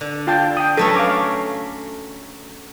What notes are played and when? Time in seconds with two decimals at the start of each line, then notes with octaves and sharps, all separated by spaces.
0.01 D3
0.27 F4 G5 A5
0.57 G5 D#6
0.77 F#3 A3 C#4 A4 B4
0.96 F5 D6